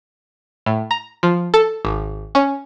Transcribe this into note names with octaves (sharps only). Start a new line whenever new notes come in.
A2
A#5
F3
A4
G#1
C#4